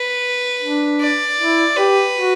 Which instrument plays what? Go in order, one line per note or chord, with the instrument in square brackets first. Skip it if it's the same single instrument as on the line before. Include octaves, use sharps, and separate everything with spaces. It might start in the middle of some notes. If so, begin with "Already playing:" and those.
Already playing: [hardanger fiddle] B4
[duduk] D4
[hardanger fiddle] D5
[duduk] E4
[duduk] G4 [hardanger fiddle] B4
[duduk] F#4